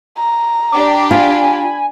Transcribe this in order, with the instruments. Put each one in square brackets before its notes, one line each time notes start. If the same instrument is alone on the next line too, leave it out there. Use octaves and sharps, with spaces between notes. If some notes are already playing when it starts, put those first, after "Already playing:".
[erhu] A#5
[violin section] D4 G4 [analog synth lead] D6
[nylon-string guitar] F4 [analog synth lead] G#5 [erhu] B5